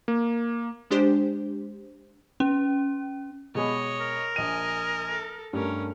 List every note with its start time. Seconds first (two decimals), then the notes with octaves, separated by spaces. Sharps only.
0.08 A#3
0.91 G#3 D4 G4 C5
2.40 C#4
3.55 B2 G#3 C#5 D#5 B5
4.01 A#4
4.36 A#1 D#5 G#5 D#7
5.10 A4
5.53 G2 A3 C#4 A#4